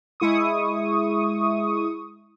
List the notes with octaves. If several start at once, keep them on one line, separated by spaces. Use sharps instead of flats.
G#3 E4 C#6 D#6